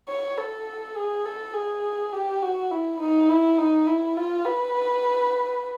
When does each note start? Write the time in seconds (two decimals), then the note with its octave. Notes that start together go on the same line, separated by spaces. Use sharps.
0.08 C#5
0.38 A4
0.96 G#4
1.26 A4
1.54 G#4
2.13 G4
2.42 F#4
2.71 E4
3.00 D#4
3.29 E4
3.58 D#4
3.87 E4
4.17 F4
4.46 B4